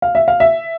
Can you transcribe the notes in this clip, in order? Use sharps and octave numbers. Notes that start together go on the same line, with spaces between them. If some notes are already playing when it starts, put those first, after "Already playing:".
F5
E5
F5
E5